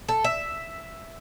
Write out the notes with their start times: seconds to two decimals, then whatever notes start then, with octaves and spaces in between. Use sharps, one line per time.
0.09 A4
0.24 E5